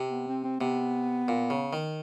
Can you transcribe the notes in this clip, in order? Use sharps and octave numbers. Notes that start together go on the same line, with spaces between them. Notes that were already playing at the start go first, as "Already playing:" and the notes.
Already playing: C3
B3
C4
C4
C3 B3
A#2
C#3
D#3